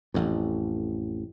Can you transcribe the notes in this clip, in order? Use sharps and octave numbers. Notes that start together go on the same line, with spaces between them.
A1 F2